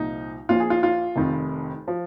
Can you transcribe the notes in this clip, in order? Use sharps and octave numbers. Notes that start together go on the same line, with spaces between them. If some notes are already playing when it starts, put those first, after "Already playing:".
Already playing: C2 A#2 F3 D#4
A#1 A#2 F3 F4
G#4
F4
F4
F1 F2 D#3
F3